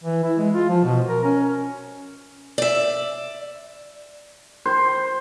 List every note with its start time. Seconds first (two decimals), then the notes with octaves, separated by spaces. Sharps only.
0.04 E3
0.24 E4
0.38 G#3
0.54 F4
0.69 F3
0.84 B2
1.08 A#4
1.24 C#4
2.58 D5 E5
4.66 C5